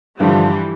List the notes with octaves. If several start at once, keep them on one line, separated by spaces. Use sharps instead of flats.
G2 D3 E3 F3 G3